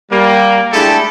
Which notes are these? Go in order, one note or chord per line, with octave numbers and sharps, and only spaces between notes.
G3 A#3
G#3 A3 D4 E4 G4 A4